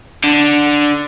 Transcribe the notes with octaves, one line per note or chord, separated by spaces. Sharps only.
D3